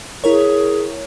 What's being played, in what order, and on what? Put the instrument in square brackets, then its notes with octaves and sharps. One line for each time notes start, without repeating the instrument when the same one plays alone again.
[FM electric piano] E4 A#4 C#5 [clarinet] G#4